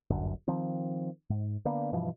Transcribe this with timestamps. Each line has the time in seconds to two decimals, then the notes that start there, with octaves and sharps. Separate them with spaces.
0.10 D1 G1 F#2 D3
0.48 D#3 F3 C4
1.30 G#2
1.65 D3 A#3 B3 D4
1.92 G2 B2 E3 F3